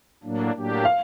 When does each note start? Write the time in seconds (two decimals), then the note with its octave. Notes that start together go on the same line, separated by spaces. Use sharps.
0.23 A2 F#3 A#3 D4
0.54 A2 F#3 A#3 D4 G4
0.85 F5